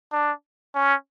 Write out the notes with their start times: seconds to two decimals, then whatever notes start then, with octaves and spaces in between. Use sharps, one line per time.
0.13 D4
0.75 C#4